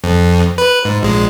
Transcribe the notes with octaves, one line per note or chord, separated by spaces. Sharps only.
F2
B4
G#2
A#1 G#3